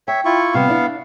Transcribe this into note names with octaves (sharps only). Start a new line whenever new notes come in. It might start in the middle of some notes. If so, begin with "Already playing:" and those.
C#5 E5 G5
E4 F4 C#6
C3 G3 B3 F5
D4 E4